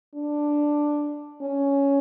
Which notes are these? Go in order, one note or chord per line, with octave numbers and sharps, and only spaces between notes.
D4
C#4